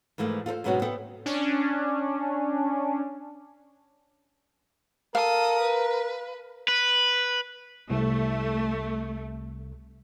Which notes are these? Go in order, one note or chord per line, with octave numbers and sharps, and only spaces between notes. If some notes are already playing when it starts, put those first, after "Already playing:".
G#2 E3 F3 A3 A#3
F4 A4 A#4 C5
G#2 B2 F#3 B3 C#4 F#4
B3 A4 C5 E5 G5
C#4 D4
A4 A#4 F5 D#6
B4
B4
C2 A3